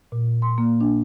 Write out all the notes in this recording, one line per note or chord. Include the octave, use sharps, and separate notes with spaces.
A#2
C6
A#3
D4